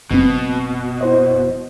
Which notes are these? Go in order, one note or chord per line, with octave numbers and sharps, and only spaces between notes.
F#1 B2 C4
E4 C5 D#5